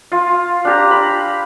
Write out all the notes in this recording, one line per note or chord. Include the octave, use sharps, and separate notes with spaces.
F4
D4 G4 A#5
B5